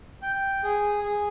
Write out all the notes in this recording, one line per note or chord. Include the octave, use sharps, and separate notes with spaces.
G5
G#4
G#4